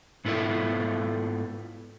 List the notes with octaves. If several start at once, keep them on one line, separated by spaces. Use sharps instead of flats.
G#2 B3 E4 F4 A4 E5